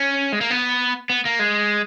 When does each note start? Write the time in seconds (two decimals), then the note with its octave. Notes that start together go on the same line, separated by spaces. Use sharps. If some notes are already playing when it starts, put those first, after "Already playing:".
Already playing: C#4
0.32 G#3
0.41 A#3
0.51 B3
1.10 B3
1.25 A#3
1.39 G#3